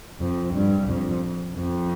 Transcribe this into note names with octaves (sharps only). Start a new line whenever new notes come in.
F2
G2
F2
F2